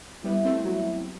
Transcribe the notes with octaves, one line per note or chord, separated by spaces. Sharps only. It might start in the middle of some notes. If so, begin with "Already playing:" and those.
G3 B3 E4
A3 C4
F#3 E4